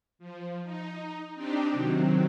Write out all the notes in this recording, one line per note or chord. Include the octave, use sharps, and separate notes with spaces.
F3
D#4
C4 D4 D#4 G4
C3 D#3 F#3 C4